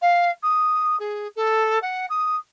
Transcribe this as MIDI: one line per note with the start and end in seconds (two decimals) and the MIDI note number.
0.02 0.30 77
0.43 0.96 87
1.00 1.28 68
1.36 1.79 69
1.82 2.06 78
2.10 2.36 87